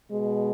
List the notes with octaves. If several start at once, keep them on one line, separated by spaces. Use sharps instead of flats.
B2 G#3